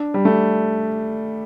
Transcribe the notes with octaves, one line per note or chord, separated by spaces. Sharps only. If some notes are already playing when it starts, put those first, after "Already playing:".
Already playing: D4
G3
A3